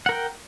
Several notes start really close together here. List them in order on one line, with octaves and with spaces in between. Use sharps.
F#5 A#4 G5